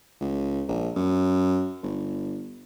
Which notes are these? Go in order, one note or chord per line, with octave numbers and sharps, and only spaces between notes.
C#2
A#1
F#2
G1